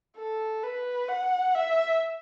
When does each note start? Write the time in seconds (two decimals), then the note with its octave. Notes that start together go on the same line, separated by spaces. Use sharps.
0.16 A4
0.63 B4
1.08 F#5
1.55 E5